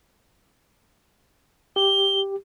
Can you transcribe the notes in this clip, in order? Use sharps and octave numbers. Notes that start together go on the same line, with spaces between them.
G4 G7